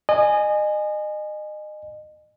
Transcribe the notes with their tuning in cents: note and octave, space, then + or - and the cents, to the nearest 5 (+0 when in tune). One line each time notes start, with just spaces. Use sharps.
D#5 -30 G#5 +0